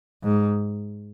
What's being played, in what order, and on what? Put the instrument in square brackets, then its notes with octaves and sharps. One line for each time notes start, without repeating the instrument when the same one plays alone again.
[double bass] G#2